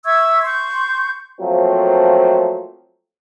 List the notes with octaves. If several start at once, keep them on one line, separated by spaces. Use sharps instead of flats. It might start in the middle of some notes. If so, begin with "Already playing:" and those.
E5 C#6 E6 G#6
C6 C#6 G6
F3 F#3 A3 A#3 C4